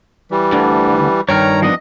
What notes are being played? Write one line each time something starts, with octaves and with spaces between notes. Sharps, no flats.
E3 G3
D2 D3
G2 D#3 C#5 G5 A#5 F6
F3 B3 D4 D#5